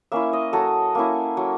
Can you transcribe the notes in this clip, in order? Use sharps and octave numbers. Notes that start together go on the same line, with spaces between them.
A#3 C#4 E4 E5
D#5
F#3 A4
A#3 C#4 E4
F#3